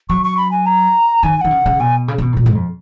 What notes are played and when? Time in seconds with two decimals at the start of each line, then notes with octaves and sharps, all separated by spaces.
0.09 F#3 C#6
0.24 C#6
0.37 B5
0.51 G#5
0.66 A#5
1.23 D#3 G#5
1.37 G#5
1.41 D#3 F#5
1.51 C#3
1.66 C#3
1.79 B2 G#5
2.08 C#3
2.18 C#3
2.22 B2
2.32 G#2
2.37 A#2
2.46 G#2
2.55 F2